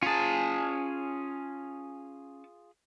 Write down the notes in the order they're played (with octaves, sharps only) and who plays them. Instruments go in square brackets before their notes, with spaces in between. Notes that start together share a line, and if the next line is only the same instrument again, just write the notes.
[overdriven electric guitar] C#4 A5 [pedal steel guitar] F4 G#4